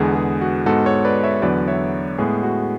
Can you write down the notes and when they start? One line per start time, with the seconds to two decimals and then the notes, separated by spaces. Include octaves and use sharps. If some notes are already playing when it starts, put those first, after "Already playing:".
Already playing: E2 D3 G#3 B3 G#4
0.16 G#4
0.41 F#4
0.66 G#2 G#3 B3 F#4 A4
0.86 A4 C#5
1.05 B4 D5
1.24 C#5 E5
1.42 E2 D3 F#3 B3 B4 D5
1.68 C#5 E5
2.18 A2 G#3 B3 G#4
2.43 F#4